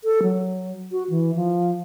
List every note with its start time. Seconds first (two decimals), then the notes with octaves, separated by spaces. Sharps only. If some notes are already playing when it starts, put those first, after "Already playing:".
0.04 A4
0.23 F#3
0.92 F#4
1.10 E3
1.36 F3